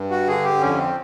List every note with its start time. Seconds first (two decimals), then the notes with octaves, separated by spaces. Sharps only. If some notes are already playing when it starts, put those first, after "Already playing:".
Already playing: G2
0.10 F#4
0.27 D3 G#4
0.44 G4
0.61 F2 C#4
0.78 C4